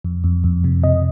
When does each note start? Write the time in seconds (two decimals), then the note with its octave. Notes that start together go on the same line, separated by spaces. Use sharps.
0.04 F2
0.24 F2
0.44 F2
0.64 C3
0.83 C3 D#5